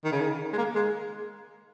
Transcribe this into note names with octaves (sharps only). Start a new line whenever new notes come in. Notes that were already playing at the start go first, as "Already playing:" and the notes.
D#3
C#3
D#3
G#3
A#3
G#3